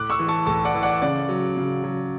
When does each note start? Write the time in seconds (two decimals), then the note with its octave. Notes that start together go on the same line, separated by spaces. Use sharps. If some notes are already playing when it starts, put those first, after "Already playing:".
Already playing: A2 D6 F#6
0.10 C#6 E6
0.19 E3
0.28 A5 C#6
0.46 A2 A5 C#6
0.65 D5 F#5
0.74 E3
0.83 D5 F#5
1.02 C#3 D5
1.29 F#3
1.57 C#3
1.84 F#3